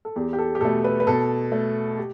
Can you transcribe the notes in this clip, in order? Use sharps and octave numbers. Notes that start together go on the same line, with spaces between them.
A4
E2 G4
G4
A4
G4
B2 A3 A4
B4
B4
B2 A4
A3
G4